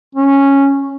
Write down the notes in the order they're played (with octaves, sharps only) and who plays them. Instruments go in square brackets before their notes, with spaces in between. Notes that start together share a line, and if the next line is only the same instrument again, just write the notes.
[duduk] C#4